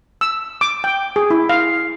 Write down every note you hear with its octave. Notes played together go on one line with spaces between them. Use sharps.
E6
D6
G5
G#4
E4
F5